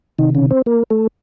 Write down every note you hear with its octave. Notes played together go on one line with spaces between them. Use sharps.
C3 D#3 D#4
C#3 C#4
C4 C5
A#3 A#4
A3 A4